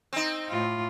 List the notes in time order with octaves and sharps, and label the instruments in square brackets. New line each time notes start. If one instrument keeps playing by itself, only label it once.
[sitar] C4 D#4
[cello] A2 F4